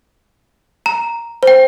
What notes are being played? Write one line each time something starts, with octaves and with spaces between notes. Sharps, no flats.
A#5
C5 G5